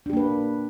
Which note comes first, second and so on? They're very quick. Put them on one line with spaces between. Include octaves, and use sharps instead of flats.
D4 G4 A#3 B4